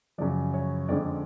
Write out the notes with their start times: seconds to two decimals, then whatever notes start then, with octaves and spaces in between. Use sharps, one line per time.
0.18 F#2 C#3 F3 D5
0.54 C#5
0.89 F2 D3 F3 G#3 C#4 D5